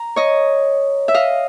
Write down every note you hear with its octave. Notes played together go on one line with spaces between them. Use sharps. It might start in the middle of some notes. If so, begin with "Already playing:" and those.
Already playing: A#5
C#5 D#5
E5
D#5 F5